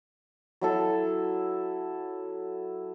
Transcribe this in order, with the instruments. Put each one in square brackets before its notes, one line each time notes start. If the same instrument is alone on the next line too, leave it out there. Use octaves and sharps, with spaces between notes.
[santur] F#3 E4 A4